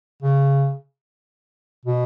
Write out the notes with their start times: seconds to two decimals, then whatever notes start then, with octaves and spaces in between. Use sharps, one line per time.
0.23 C#3
1.85 B2